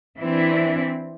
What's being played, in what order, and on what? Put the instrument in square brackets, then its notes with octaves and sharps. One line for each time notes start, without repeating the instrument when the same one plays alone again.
[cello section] E3 C4 D4 E4